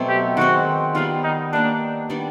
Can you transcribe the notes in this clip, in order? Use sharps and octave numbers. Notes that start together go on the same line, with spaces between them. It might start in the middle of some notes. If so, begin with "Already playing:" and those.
Already playing: B2 F#3 A3 C4
G4
D#3 G#3 C4 F#4
D#3 G3 B3 F4
D#4
G3 A#3 D4 D#4
D#3 G3 B3 D4